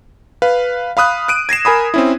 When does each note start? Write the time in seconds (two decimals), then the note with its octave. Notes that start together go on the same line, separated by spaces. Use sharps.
0.42 B4 F5
0.97 F5 B5 D#6 F#6
1.28 F#6 D7 D#7
1.49 G#6 A#6 C7 E7
1.65 A#4 G#5 B5 D#6
1.94 C4 C#4 E4